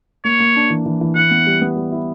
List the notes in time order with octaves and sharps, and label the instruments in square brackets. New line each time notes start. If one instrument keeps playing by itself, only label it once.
[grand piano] A#3 [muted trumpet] C#5
[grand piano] A#3
D4
E3
E3
E3
[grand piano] E4 [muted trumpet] F#5
[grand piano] B3
G3
B3
G3
E4